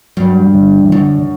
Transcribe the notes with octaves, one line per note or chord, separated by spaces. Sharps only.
G2 F#3
D3
E3
F#2 D3